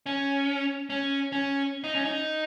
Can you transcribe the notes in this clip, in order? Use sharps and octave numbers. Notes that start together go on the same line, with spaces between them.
C#4
C#4
C#4
D#4
C#4
D#4